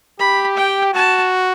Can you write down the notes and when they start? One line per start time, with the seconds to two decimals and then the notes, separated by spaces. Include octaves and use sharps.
0.19 G4 B5
0.57 G5
0.94 F#4 A5